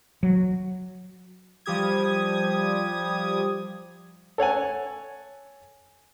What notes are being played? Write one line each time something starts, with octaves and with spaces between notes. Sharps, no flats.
F#3
F3 G3 G4 D#6 G#6
A4 C#5 F#5 G#5